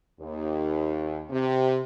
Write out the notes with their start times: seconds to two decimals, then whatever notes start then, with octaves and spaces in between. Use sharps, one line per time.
0.20 D#2
1.30 C3